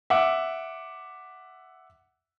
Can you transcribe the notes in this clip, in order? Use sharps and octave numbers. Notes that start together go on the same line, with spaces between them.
E5 F#5 D6